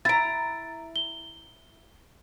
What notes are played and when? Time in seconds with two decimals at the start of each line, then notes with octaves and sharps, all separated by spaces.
0.05 E4 A#5 A6 D7
0.96 G7